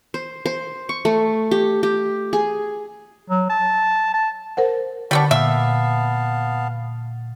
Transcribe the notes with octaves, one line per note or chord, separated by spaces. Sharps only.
C5
C5
C#6
A3
G4
G4
G#4
F#3
A5
A5
A#4 C5 F#5
D3 G3 B3 D4 C#6
A#2 B3 E5 F5 A5